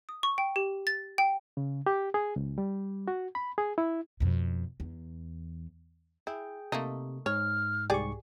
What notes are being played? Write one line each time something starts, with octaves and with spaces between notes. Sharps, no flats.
D#6
C#6
G5
G4
A6
G5
C#3
G4
G#4
C#2
G3
F#4
B5
G#4
E4
F2 B2
E2
E4 G#4 G5
C3 A3 A#3 D#4
G#2 C#5 F6
C2 G#2 G4 G#4 D5 C#6